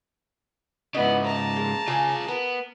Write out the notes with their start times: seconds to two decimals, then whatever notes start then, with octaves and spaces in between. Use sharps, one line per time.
0.95 G#2 C#3 B3 E4 D#5
1.26 A5 A#5
1.56 G#3 A#3
1.88 C#3 F4 G#4 G#5
2.28 B3 A#4